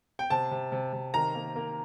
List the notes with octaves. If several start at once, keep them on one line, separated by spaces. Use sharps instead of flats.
G5
C3 A5
C3
C3
C3
D#3 A#5
A#3
A#3